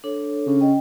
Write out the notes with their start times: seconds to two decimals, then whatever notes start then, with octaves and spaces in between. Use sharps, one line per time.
0.04 D4 A4 C#5
0.47 C#3
0.61 D#5 G5